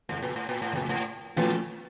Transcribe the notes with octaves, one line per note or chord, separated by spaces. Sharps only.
F2 A2 C#3 A3
A#2
A2
A#2
A2
F2 A#2 C#3 A3
A2
A#2 F3 A3 C#4 F4 A4